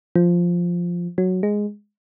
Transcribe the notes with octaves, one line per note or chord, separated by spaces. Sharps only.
F3
F#3
G#3